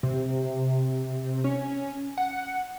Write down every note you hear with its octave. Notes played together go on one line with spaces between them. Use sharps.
C3
C#4
F#5